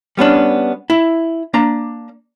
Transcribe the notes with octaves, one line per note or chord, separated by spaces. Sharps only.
G3 B3 C#4 D4
E4
A#3 D4 A#5